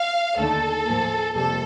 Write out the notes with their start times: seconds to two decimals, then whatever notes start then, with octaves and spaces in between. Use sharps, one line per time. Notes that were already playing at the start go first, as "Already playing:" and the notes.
Already playing: F5
0.37 D#2 D3 A3 D#4 A4
0.86 A2 F3 A#3
1.35 F2 C3 G3 A#3 A4